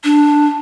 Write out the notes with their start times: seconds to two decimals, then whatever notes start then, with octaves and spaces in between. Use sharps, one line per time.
0.04 D4